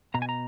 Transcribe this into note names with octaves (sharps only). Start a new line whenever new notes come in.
B2 A#5
G#5
A#5